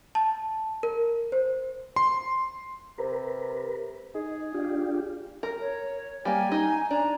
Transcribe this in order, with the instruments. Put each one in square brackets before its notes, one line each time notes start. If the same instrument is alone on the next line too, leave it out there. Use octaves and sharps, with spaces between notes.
[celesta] A5
A#4
C5
[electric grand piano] C6
[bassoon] C3 [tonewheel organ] A#4 B4
[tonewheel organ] D#4 [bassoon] G#4
[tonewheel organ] D4 F4 G4
[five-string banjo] A#4
[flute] C#5
[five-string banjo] G3 A#3 [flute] G#5
[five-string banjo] D#4
[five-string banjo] D4 [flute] A#5